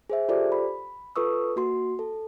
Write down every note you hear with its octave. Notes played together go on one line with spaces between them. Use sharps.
G#4 C5 E5
F4 G4 A4 C5 D5
B5
F4 A4 B4 C#6 D#6 E6
A#3 F#4 C6
A4